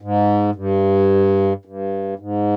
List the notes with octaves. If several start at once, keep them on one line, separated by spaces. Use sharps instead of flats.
G#2
G2
G2
G#2